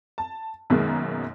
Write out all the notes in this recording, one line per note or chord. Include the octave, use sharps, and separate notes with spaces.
A5
F#2 B2 D#3 G#3 A#3